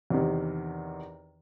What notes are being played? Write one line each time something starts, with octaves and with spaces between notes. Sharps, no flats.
E2 C3 D#3